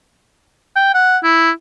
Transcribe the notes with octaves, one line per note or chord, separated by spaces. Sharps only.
G5
F#5
E4